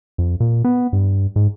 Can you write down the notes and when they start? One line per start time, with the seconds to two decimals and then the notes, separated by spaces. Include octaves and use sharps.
0.18 F2
0.40 A#2
0.64 B3
0.93 G2
1.36 G#2